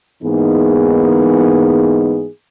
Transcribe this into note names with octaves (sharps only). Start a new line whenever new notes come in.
G#2 E3 A#3 B3 D#4 G#4